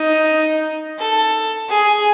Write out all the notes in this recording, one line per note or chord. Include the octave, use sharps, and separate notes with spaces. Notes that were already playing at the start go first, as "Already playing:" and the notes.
Already playing: D#4
A4
G#4